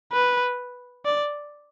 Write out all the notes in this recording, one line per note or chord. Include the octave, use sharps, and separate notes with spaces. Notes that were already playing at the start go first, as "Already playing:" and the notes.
B4
D5